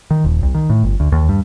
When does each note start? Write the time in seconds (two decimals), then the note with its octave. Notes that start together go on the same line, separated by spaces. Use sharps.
0.11 D#3
0.24 D#1
0.43 C2
0.54 D#3
0.70 A2
0.83 G1
1.00 D2
1.12 D#2
1.29 G2